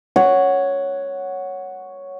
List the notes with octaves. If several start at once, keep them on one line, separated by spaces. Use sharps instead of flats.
C#5 F#5